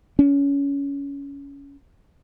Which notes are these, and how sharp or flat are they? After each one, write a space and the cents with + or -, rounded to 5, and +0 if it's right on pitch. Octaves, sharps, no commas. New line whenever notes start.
C#4 +20